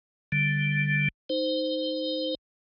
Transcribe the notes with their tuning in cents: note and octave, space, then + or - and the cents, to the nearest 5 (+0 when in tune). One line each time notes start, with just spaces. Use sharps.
D3 +0 G3 +0
D#4 +0 C5 -10